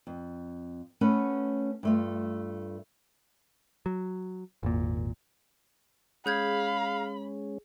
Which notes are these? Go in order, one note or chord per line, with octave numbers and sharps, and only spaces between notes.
F2
A3 C#4 B4 F#5
G2 A3 F4
F#3
G#1 E2 A#2 A#3
G#3 C#4 G#4 F5 B5 G6 G#6